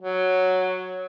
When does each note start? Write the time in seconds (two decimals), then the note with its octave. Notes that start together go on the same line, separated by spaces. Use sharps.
0.01 F#3